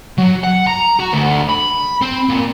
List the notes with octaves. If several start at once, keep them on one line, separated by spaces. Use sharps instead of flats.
F#3
F#5
A#5
F#4
D2
B5
C4
A#2